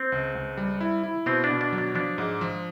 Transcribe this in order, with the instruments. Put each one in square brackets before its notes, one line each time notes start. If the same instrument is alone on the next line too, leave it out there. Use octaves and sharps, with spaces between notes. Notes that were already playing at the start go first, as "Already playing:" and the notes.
Already playing: [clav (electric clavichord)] C4
[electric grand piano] C#2
C#2
G3
E4
E4
[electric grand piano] B2 [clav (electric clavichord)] C4
[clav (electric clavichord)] D4
[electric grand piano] B2
[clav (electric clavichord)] D4
[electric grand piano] F#3
[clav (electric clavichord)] D4
[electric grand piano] F3 [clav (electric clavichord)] D4
[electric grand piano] G#2
F3